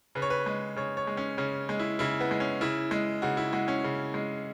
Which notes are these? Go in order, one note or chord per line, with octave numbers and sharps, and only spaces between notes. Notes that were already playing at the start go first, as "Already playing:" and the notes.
C#3 B4
C#5
B4
G#3
C#3 C#5
C#5
G#3
C#4
C#3 C#4
G#3
E4
C#3 E4
B3
G#3
C#4
C#3 E4
G#3
C#3 F#4
E4
G#3 F#4
C#4
C#3
G#3